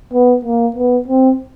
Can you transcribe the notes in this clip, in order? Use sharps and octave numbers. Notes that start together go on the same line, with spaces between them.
B3
A#3
B3
C4